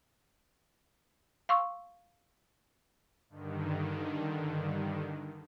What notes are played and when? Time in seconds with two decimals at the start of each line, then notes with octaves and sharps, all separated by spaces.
1.49 F5 C6 C#6 E6
3.30 G2 D3 D#3